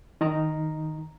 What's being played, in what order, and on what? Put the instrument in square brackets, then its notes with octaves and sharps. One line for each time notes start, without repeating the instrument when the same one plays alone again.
[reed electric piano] D#3 D#4 A#5